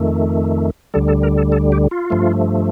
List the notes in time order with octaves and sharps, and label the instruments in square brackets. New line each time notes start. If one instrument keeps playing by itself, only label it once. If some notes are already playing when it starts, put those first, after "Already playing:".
Already playing: [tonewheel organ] F2 D#3 A3
D2 D3 G3 A4
A4
A#4
A4
A4
G4
F4
G2 F3 A3